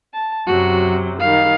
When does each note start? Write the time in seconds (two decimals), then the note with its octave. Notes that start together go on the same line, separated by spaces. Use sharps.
0.13 A5
0.47 F#2 C3 F#3 F#4
1.19 D#3 G3 F5